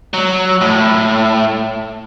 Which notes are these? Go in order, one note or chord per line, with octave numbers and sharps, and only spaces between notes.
F#3
A2